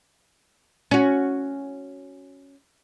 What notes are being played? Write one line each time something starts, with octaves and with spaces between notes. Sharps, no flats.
C#4 F#4